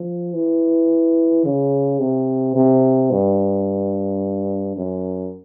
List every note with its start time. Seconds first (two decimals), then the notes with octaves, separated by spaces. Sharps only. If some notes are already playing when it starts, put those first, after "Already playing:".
Already playing: F3
0.34 E3
1.45 C#3
2.00 C3
2.55 C3
3.11 G2
4.77 F#2